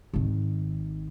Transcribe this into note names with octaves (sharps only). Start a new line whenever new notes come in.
G#1 D#3